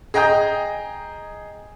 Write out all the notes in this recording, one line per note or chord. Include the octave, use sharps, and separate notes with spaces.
G#4 D#5 G5 A#5 D#6 G6